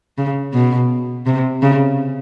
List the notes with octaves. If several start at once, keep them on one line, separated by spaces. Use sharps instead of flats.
C#3
B2
C3
C#3